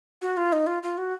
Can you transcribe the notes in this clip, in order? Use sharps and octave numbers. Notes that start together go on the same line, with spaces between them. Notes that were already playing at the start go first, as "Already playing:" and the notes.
F#4
F4
D#4
F4
F4
F#4